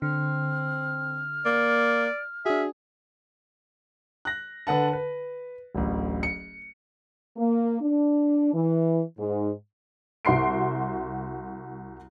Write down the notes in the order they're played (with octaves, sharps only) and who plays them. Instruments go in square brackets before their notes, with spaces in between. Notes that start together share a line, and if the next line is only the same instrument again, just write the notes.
[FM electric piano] D3 [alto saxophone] C4 [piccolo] F6
[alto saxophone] A#3 [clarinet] D5
[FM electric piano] D4 F#4 [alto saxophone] G#4 [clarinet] E5
[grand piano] F#6 A#6
D3 B4 F#5 A5
B4
D1 A1
C#7
[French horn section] A#3
D4
E3
G#2
[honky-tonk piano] C2 F#4 C6 C7 D7